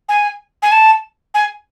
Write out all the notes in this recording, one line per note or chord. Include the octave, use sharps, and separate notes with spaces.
G#5
G#5
A5
G#5